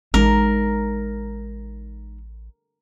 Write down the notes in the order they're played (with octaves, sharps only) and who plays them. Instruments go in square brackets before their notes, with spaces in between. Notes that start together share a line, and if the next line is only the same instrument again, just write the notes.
[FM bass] A1 [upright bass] G#3 D#4 [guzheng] A#4